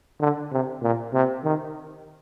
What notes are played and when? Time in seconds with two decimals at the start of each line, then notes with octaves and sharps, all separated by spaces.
0.20 D3
0.52 C3
0.82 A#2
1.13 C3
1.44 D#3